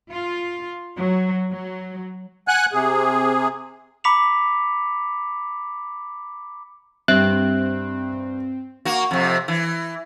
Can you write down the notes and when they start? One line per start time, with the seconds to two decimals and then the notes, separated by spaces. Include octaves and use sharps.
0.11 F4
0.97 F#3
1.50 F#3
2.48 F#5 G#5 F#6
2.73 C3 G#4
4.04 A#5 B5 D6 B6 C#7 F7
7.08 G2 C4 E5 F#6
8.85 A#3 F#4
9.11 F2 C3
9.48 E3